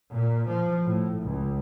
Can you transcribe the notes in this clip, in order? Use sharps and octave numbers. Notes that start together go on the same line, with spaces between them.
A#2
F3
A2
C#2